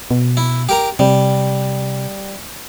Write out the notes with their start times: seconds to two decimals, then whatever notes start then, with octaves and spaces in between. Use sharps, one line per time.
0.11 B2
0.37 E4
0.69 G4 A#4 A#5
0.99 C3 G3